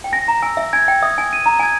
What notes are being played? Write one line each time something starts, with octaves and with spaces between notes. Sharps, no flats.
G5
G#5 A#6
A#5
G#5 E6
E5
G#5 G#6
G5
E5 D#6
G#5
D#7
A#5
G#5 G#6